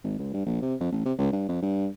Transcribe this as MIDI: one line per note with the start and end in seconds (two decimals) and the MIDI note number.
0.04 0.18 32
0.19 0.29 37
0.34 0.42 43
0.46 0.59 34
0.62 0.74 48
0.80 0.91 41
0.92 1.01 33
1.05 1.13 48
1.18 1.28 37
1.32 1.48 43
1.49 1.61 41
1.62 1.88 43